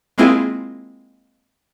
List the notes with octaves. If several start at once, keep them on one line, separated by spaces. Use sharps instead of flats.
G#3 A#3 C4 E4 F4 G#4